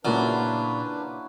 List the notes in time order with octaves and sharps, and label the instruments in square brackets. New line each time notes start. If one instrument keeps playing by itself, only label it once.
[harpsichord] A#2 [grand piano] C#3 A#3 [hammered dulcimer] F#3 E4 C6 [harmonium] D4 B4